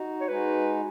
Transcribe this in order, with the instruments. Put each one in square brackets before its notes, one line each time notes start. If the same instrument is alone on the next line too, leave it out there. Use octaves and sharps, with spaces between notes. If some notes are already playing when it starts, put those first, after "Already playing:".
Already playing: [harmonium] D#4 F#4
[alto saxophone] C#5
[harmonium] G#3 D#4 F#4 [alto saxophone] B4